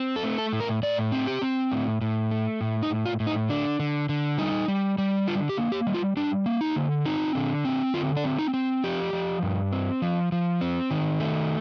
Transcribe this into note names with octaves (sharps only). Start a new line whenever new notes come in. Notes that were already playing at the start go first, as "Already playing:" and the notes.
Already playing: C4
A4
A3
A4
A2
A#4
A2 D5
C4
G4
C4
A2
A2
A3
A2
D#4
A2
F4
A2
D#4
D3 D4
D3
D3
G3 D#4
G3
G3
D3 F4
G4
A#3
G4
G3
F4
G3 D4
A#3
D#4
D3
C4 D#4
D3
C4
D3 F4
D4
C4
D#4
C4
F3 G4
F3
G2
C4
F3
F3
C4
D#3
A3